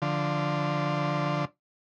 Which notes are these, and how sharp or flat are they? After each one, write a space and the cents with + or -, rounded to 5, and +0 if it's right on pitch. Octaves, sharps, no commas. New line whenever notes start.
D3 +0 F3 +0